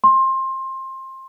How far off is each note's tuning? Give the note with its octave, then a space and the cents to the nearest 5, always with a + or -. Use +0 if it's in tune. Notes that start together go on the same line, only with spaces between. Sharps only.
C6 +20